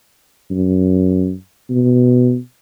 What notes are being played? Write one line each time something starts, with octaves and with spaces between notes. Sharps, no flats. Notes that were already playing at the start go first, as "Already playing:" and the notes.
F#2
B2